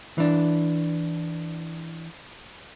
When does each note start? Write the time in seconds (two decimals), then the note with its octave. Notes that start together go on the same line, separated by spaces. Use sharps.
0.18 E3 D4